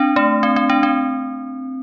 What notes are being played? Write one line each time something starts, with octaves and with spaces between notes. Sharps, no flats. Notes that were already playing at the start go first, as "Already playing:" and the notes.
Already playing: C4 D4
A3
C4
C4
D4
C4